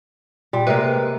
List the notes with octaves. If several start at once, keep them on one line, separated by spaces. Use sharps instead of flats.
A#2 G3
C3 G#3 A#3 B4